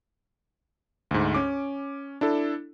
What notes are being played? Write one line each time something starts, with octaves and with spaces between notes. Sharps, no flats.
D2 G#2
C#4 D6
D4 E4 A4